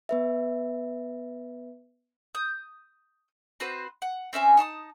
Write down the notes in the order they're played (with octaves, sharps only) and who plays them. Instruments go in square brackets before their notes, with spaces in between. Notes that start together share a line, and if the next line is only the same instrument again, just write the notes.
[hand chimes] B3 B4 E5
[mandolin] D#6 G6
C4 F#4 B4 C5
F#5
C4 C#4 E5 G#5
D#4 A5 C6 D#6